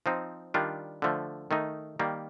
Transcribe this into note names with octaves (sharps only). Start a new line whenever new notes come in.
F3 C4 D#4
D#3 G3 D4 F4
D3 F3 A3
D#3 A3 D#4
D#3 G3 A#3